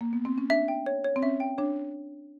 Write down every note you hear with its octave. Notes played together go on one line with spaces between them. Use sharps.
A#3
B3
C4
C#4
D4 E5
G5
C#5
C#5
C4
C#4 E5
G5
D4 C#5